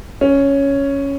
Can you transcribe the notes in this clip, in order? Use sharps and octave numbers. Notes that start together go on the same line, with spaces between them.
C#4